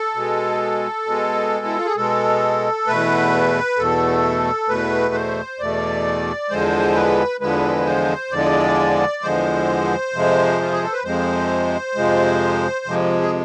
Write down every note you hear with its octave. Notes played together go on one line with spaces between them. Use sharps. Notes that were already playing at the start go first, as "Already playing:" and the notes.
Already playing: A4
B2 G#3
B2 G#3
E4
F4
G#4
B2 G#3 A4
E2 B2 A3 B4
E2 B2 A3 A4
E2 B2 A3 B4
C5
E2 B2 A3 D5
E2 D3 F3 G#3 C5
B4
E2 D3 F3 G#3 B4
C5
E2 D3 F3 G#3 D5
E2 D3 F3 G#3 C5
F2 C3 F3 G#3
F4
G#4
A4
B4
F2 C3 F3 G#3 C5
F2 C3 F3 G#3
F2 C3 F3 G#3
G#4